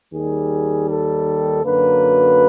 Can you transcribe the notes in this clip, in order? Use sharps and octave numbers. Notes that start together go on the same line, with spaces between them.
D#2 D#3 G3 G#4
A4
F#2 D3 F#3 A#3 B4